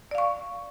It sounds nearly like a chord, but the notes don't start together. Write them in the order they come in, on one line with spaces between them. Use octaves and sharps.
D5 F5 C#6